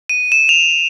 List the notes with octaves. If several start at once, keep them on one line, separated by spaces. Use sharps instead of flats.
D#7
E7
F7